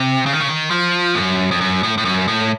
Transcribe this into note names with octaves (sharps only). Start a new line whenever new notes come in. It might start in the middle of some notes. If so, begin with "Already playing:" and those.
Already playing: C3
C#3
D#3
C#3
D#3
F3
F#2
F2
F#2
A2
A2
F#2
A2